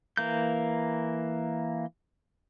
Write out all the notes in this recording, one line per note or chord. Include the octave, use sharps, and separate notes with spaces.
E3 A#3 G6